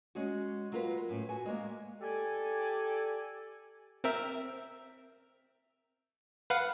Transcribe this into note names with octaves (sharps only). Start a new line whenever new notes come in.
G#3 C#4 F#4
F#3 A#3 F4 A#4 B4
A2 C#4
F#4 G#5
G#3 A#3
G4 A4 D5 G#5
C4 A#4 E5
B4 F5 F#5